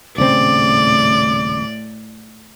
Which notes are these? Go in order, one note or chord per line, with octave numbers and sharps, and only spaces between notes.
D#1 A2 C#3 C4 D5 D6